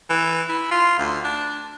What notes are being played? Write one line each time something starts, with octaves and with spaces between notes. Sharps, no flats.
E3
E4
F4
D2
D4